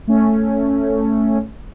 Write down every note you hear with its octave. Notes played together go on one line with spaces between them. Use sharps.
A3 C#4